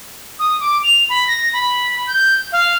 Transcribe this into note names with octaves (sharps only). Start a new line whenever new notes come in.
D#6
D6
F7
B5
A#6
B5
G6
F5